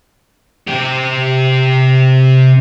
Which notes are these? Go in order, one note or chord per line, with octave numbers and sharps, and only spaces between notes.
C3 G4